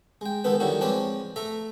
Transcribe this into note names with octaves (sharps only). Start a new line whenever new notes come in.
G#3 G5
D#3 G#3 B3 A4 B4
D3 D#3 F#3 G3 E4 F#4
F3 G#3 C4 B4 C#5 D5
A3 E5 A#5